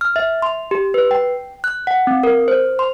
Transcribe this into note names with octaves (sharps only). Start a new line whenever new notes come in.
F6
E5
C6
G4
B4
G5
F#6
F#5
C4
A#4
C5
C6